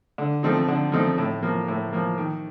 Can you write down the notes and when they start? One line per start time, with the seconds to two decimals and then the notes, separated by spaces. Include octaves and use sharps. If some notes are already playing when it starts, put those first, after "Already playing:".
0.18 D3
0.43 F3 A3 C4 D#4
0.68 D3
0.92 F3 A3 C4 D#4
1.18 A2
1.43 F3 A#3
1.68 A2
1.93 F3 A#3
2.18 D#3